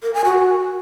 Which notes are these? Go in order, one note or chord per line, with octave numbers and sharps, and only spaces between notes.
A#4
G#5
F#4